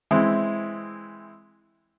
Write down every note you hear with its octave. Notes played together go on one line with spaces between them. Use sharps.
E3 G#3 C4 E4